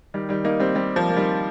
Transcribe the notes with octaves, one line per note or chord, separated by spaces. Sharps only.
D#3 G3
D#3 G3
A#3 D#4
G3 C4
G3 C4
F3 A#3
A#3
D#3 G3